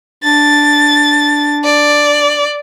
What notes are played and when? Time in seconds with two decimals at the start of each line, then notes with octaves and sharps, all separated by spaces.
0.24 D4 A6
1.64 D5